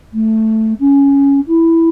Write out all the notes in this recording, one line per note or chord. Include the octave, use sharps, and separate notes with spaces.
A3
C#4
E4